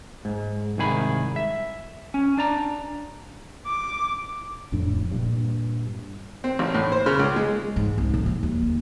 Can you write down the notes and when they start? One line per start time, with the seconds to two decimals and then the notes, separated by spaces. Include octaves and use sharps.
0.25 G#2
0.78 C2 G#2 D#3 G#4 B5
1.36 E5
2.14 C#4
2.37 D4 D5 A#5
3.67 D6
4.72 D1 F2 A2 D4
5.11 G2 A#2
6.44 C4
6.59 A1
6.74 A2
6.92 C5
7.06 C#3
7.19 C#2
7.36 G#3
7.76 G#2
7.98 C2
8.14 A2
8.26 F3
8.43 D#2
8.62 D2